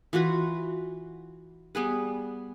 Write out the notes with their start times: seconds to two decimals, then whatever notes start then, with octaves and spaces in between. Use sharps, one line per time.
0.13 E3 F4 F#4 B4
1.75 G3 B3 G#4 B4